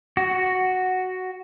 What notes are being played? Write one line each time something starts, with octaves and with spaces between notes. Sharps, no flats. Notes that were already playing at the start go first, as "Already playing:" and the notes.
F#4